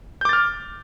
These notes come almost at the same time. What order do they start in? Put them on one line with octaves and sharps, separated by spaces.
G6 D6 A6 F6